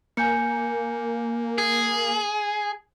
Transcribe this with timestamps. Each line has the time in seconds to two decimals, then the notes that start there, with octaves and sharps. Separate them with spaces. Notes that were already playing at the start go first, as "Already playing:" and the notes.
0.17 A#3 G#5 G6 C#7
1.58 G#4